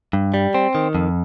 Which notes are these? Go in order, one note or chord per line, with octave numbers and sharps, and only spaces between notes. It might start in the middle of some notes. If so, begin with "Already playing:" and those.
G2
G3
C4
D#3
F2